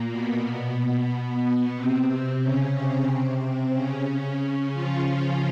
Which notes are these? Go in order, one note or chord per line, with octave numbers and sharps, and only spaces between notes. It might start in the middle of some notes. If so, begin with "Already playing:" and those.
Already playing: A#2 A#3
B2 B3
B2 B3
C3 C4
C#3 C#4
C3 C4
C3 C4
C#3 C#4
F3 F4